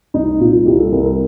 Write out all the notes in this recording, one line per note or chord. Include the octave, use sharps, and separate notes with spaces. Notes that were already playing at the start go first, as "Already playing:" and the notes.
C2 D#4
A#2 F4
C2 G4
A4
C2 A#4
A4
A#4